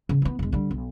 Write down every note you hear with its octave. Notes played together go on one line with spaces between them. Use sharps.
C#3
E3 B3
E1 G#3
D3 G3
B1